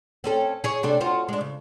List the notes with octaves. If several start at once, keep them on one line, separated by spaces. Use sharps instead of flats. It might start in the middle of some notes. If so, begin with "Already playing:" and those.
C4 C#4 A4
G#4 C#5
C3 D4 A4
F4 F#4 C5
G#3 D4
C#3